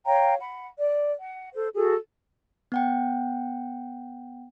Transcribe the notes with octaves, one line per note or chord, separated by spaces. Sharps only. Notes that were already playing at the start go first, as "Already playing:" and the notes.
C#5 F5 G5 A#5
F#5 B5
D5
F#5
A4 C5
F#4 G#4 A4
B3 F#5 G5